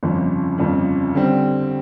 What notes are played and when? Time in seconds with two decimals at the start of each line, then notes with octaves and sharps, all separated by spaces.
0.03 G1 F2 C#3 F3
0.58 G1 F2 C#3 F3
1.14 D3 G3 C4